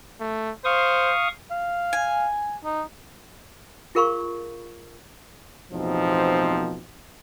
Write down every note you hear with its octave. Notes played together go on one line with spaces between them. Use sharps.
A3
C5 F5 C#6 D#6
F5
G#5
D#4
F4 G#4 A#4 F5 B5 C#6
A1 E2 B2 F3 C4 D#4